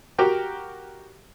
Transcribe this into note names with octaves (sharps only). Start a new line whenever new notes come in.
F#4 G4 A#4 G5